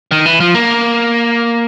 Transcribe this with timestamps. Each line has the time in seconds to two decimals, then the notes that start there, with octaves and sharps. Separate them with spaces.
0.11 D#3
0.26 E3
0.40 F3
0.55 A#3